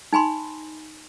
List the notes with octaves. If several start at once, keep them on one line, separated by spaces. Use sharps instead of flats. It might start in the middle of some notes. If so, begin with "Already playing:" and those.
D#4 G#5 B5 C6